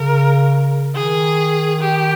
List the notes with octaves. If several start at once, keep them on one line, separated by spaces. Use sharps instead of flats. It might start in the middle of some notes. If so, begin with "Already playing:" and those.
Already playing: C#3 A#4
D#3 G#4
G4